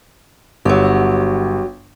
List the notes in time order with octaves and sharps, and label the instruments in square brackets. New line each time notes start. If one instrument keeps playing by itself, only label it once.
[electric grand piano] G1 [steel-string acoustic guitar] F#3 G4